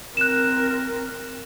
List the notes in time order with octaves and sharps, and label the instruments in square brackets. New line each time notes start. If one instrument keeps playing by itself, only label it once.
[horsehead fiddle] C4 A#4 [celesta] F#6 E7